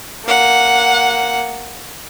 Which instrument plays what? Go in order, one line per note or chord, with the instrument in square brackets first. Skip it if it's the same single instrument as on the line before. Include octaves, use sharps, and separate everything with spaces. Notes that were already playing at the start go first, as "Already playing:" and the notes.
[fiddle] A#3 F#5